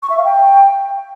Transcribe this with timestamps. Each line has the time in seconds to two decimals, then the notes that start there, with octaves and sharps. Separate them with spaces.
0.03 C#6
0.10 E5
0.17 F5
0.24 G5